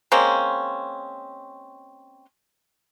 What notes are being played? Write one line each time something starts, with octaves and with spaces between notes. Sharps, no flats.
G#3 A#3 C4 C#4